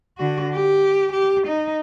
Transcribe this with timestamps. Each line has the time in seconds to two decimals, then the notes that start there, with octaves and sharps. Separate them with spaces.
0.18 D3 F#4
0.53 G4
1.12 G4
1.47 D#4